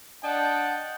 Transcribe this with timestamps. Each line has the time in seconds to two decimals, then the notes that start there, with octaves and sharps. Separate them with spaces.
0.23 D4 D#5 F#5 G5 A5